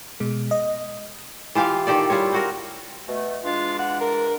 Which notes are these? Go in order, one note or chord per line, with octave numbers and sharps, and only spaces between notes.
B2 G#3
D#5
E3 F4 G4 F5
D#3 G4 A4 D5
G3 E4 F4 C#5
C4 F#4 A#4
B2 A3
E3 G#3 D4 F4
F#5
A#4